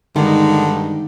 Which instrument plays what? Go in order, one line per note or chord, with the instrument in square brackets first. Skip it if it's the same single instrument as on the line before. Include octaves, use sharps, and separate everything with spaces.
[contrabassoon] G2 [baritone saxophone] D3 [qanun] D#3 [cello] G#3 D#4